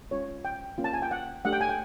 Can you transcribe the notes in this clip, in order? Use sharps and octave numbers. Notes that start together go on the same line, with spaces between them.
G#3 C#4 F4 C#5
G5
A#3 C#4 F4
A5
G#5
G5
F#5
A3 D4 G4 F#5
G5
G#5
G5